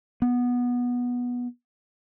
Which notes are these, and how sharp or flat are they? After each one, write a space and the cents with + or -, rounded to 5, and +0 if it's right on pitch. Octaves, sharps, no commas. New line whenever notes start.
B3 -10